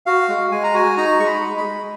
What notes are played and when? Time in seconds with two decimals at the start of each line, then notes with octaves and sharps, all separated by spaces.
0.06 F#4 F5
0.29 G#3
0.51 G#3 G#5
0.64 A#5
0.74 F#4 G#5
0.97 D#4 A#5
1.19 G#3 C#6
1.26 B5
1.41 G#3
1.57 B5
1.64 G#3